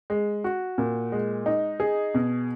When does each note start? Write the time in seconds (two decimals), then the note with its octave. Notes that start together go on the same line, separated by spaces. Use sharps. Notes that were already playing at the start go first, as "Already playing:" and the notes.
0.10 G#3
0.44 F#4
0.78 A#2
1.12 G#3
1.46 D#4
1.80 G#4
2.14 B2